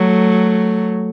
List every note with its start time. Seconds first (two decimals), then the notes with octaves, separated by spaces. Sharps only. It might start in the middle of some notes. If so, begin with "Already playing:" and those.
Already playing: F#3 A3